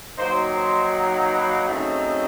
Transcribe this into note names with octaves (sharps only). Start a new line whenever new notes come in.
D#3 F#3 A#3 D#4 C5
C5
B4
C#3 F#3 A3 C4 D#4